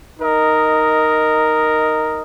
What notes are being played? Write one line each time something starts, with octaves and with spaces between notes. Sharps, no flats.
D#4 A#4 D#5